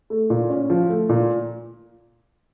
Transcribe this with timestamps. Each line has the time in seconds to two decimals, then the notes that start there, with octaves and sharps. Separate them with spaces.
0.10 A3
0.30 A#2
0.50 C#4
0.70 F3
0.89 A3
1.09 A#2